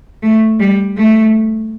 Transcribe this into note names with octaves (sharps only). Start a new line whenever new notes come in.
A3
G3
A3